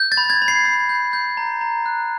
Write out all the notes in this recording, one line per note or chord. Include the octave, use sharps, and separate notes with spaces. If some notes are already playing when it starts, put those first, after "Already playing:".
Already playing: G6
A6
B5
G#6
B5
C7
B5
G6
G6
A#5
A#5
F#6